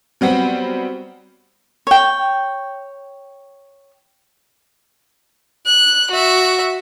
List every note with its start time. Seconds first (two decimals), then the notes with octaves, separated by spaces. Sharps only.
0.21 F#3 G3 B3 C4 F#4
1.87 C#5 G5
5.66 F#6
6.10 F#4 E5